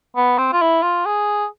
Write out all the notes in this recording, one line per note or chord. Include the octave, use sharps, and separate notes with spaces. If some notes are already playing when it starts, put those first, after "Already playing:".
B3
C4
F4
E4
F4
G#4